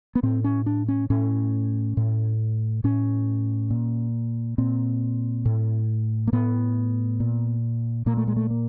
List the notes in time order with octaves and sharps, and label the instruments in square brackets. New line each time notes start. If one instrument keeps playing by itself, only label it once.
[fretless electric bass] B3
A2 C4
C#4
D4
C#4
A2 C#4
A2
A2 C#4
A#2
A#2 C4
A2
A#3
A2 B3
A#2
A#2 A#3
A3
G#3
A3
A#3